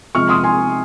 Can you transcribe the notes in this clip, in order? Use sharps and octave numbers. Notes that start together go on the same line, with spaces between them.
C3 F3 G#3 C#6 F6
C6 D#6
G#5 C6